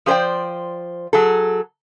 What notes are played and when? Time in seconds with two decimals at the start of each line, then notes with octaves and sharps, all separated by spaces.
0.06 F3 G#4 C5 D5 G5
1.13 F#3 G#4 A4